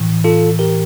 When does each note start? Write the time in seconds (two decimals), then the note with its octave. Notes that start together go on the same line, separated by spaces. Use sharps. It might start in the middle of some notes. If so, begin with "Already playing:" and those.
Already playing: A2 E3
0.24 F4 A4
0.59 G4 A#4